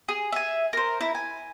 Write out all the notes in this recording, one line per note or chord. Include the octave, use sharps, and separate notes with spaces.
G#4
E5 G#5
A#4 C5
E4
G#5